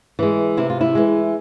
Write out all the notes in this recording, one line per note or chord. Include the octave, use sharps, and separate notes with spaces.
E3 G#3
C3 E4
F4
E4
E3 G#3